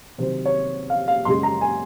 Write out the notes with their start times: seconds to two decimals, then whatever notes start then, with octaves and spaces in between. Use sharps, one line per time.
0.18 C3 D#3 F#3 C5
0.45 C#5
0.90 F5
1.08 F5
1.25 F#2 C#3 G#3 C6
1.43 A#5
1.61 G#5